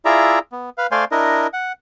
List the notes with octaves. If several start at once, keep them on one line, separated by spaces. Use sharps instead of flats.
E4 F4 G#4 D5 E5 A#5
B3
B4 F5
A3 C5 D5 F5 G#5 C6
D4 E4 A#4 D#5
F#5